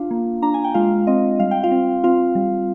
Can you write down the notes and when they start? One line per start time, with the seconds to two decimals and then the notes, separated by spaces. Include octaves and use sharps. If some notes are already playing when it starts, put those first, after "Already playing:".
Already playing: D4 F4 F5
0.11 A#3
0.42 D4 A#5
0.54 G#5
0.64 G5
0.74 G#3 F4 F5
1.07 C4 D#5
1.39 G3 F5
1.51 G5
1.63 F4 F5
1.72 C4
2.04 C4 F4 F5
2.35 G3